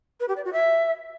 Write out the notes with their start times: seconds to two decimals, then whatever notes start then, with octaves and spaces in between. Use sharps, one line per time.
0.20 B4
0.28 G4
0.37 D5
0.45 F#4
0.53 E5